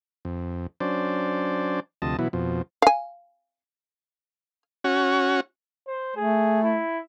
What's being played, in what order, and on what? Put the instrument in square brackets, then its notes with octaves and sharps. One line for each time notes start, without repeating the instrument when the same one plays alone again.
[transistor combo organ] F2
F#3 C#4 D4 C5 D5
D2 C3 F3 D#5 A5
B2 E3 F#3 B3 E4
F2 B2 F3
[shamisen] F5 G#5
[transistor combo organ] C#4 F#4
[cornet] C5
[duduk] A3 [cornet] G#4
[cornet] E4